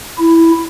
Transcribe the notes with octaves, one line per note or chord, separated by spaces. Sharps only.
E4